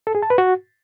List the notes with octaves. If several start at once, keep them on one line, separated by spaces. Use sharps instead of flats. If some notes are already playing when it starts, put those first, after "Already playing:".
A4
G#4
A5
B4
F#4